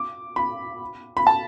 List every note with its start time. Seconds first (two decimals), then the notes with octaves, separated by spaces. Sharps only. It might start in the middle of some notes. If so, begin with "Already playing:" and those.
Already playing: D6
0.36 B5
1.17 B5
1.27 A5